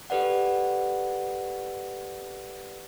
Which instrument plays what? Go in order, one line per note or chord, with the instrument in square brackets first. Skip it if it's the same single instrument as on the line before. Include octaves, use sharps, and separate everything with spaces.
[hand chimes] G4 A4 B4 D5 F#5